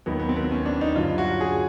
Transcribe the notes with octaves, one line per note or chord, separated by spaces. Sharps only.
D#2 D#3 F#3 B3
B3
C4
B3
C4
C#4
D4
D#4
G2 D3 F#3 F4
F#4
G#4